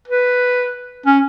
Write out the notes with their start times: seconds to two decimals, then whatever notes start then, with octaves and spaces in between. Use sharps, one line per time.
0.08 B4
1.06 C#4